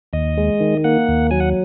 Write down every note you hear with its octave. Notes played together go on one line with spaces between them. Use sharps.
D#2 D#5
G#3
D#3
A#3 F#5
D#2
F#3 G#5
F#5